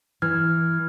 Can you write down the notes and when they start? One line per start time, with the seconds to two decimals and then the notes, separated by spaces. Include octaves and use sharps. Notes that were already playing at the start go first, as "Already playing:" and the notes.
0.22 E3 F6 G#6